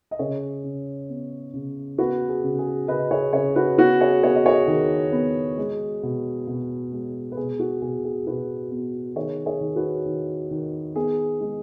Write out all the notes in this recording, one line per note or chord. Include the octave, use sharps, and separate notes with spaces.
D#5
C#3 G#4 C#5
C#3
B3
C#3
B3 F#4 B4
G#4
C#3
G#4
C#3 B4 D#5
G#4 C#5
C#3 G#4 C#5
F#4 B4
B3 F#4 B4
G#4 C#5
B3 G#4 C#5
D#5
G#4 C#5
D#3 G#4
B3
G#3
B2
B2
G#3
B4
B2 G#4
F#4
B2 G#4
G#4
B2 F#4 B4
B3
D#3 G#4 C#5
G#4 C#5
D#3
F#4 B4
D#3
D#3
B3 G#4
G#3